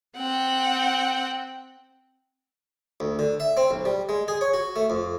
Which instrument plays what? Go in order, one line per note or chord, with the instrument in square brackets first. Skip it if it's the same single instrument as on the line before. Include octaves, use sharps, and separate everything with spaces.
[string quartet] C4 F#5 G5
[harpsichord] D2
D3
E5
C4
B1
G3
G#3
G#4
C#5
F#4
A3
F2